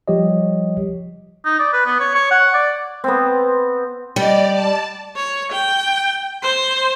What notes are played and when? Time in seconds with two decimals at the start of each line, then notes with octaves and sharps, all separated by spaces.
0.08 F3 G3 G4 C#5 D#5
1.45 D#4
1.59 D5
1.73 B4
1.86 B3
2.00 C#5
2.15 C#5
2.31 F#5
2.54 D5
3.04 B3 C4
4.16 G3 D5 D#5 F#5
4.52 A5
5.16 C#5
5.52 G5
6.43 C5